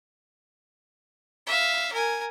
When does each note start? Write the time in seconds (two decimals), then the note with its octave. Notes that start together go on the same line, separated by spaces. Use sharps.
1.47 E5 F5
1.93 A#4 G#5